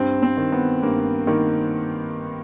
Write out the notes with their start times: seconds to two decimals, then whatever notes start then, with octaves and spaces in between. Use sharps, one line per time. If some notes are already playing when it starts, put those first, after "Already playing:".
Already playing: G2 C4
0.22 C4
0.37 D#3
0.52 B3
0.82 G2 A#3
1.27 D#3 A#3